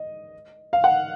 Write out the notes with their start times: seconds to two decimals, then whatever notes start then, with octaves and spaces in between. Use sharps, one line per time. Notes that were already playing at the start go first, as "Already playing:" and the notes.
Already playing: D#5
0.73 F5
0.84 F#5